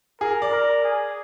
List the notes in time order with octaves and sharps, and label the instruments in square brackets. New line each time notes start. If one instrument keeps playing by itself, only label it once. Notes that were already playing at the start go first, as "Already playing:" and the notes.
[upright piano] G#4 [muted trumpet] A#4
[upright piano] D5
[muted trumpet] A#4
G#4